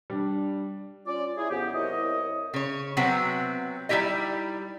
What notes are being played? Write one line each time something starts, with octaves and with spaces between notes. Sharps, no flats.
G3 D4
C#4 F4 D5
E4 G4 G#4
F2 C#3 B3 G4
C2 E4 A#4 C#5 D#5
C#3 C#5
C3 F#3 B3 C4 F#4
G3 D#4 E4 G4 D#5